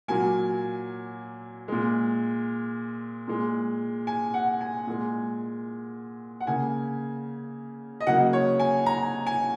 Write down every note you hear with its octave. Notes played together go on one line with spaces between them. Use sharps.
A#2 F#3 A#3 G#5
A#2 G#3
A#2 G#3
G#5
F#5
G#5
A#2 G#3
F#5
C#3 A#3 G#5
D#5
C#3 F#3 A#3 F#5
C#5
G#5
A#5
G#5